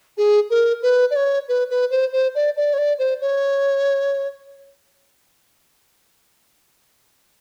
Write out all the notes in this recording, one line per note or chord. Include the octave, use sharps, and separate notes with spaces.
G#4
A#4
B4
D5
C#5
B4
B4
C5
C5
D5
D5
C#5
D5
C5
C#5